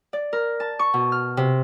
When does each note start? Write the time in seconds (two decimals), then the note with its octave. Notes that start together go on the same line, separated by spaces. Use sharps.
0.13 D5
0.33 A#4
0.60 A5
0.79 C#6
0.94 B2
1.12 F6
1.37 C3